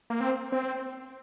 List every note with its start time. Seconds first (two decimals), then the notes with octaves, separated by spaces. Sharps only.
0.10 A#3
0.20 C4
0.52 C4